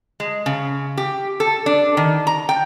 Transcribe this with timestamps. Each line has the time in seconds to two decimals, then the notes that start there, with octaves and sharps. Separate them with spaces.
0.20 G#3
0.46 C#3
0.97 G4
1.40 A4
1.66 D4
1.97 D#3
2.27 A#5
2.49 G5